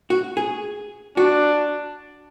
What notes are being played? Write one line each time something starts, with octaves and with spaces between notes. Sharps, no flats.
F#4
G#4
D4 F#4